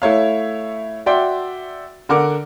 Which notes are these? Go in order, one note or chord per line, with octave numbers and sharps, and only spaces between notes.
A3 E4 C#5 F5
F#4 D5 E5 G5 C6
D3 A#4 F#5 D6